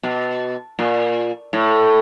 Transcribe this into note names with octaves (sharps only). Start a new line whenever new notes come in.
B2
A#2
A2